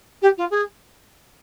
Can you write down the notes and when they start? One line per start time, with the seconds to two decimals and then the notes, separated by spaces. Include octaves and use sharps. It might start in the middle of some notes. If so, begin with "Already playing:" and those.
0.21 G4
0.37 F4
0.50 G#4